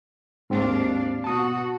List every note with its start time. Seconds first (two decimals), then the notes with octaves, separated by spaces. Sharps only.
0.50 D#2 G#2 C4 D4 F5
1.24 B2 F#4 A5 D#6